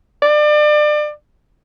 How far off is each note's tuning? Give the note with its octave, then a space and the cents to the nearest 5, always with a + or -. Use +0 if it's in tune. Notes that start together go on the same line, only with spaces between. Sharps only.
D5 +30